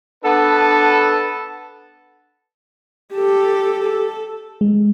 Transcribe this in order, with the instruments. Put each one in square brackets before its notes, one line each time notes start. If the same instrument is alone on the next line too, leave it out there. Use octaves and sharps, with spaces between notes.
[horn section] B3 D4 A4 B4
[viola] G4 A4
A4
[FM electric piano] G#3